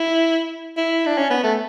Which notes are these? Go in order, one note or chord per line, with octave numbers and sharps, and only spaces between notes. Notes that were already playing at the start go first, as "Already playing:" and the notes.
Already playing: E4
E4
D4
C#4
B3
A3